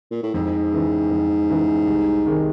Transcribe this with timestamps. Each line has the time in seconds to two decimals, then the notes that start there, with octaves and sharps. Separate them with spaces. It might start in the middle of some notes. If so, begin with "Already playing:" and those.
0.11 A#2
0.23 A2
0.34 F2 G#2
0.72 C#3 E3
1.11 F2
1.49 C#3 E3
1.87 C2
2.26 C3 D#3 G#3